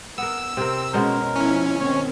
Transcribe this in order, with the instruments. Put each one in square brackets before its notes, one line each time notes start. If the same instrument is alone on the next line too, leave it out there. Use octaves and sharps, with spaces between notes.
[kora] B3 A#4 [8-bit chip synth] E6
[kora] C3 A#4 [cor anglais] C4
[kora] B2 G#3 C5 [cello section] C#4 [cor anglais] A#4
[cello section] F3 E4 [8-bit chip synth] C#4
[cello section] D#3 C4 [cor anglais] C#5